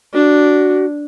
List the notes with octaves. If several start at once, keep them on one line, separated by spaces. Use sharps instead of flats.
D4 F#4